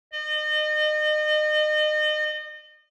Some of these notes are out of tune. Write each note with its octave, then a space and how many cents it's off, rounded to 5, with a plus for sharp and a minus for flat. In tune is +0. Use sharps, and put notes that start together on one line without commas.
D#5 -35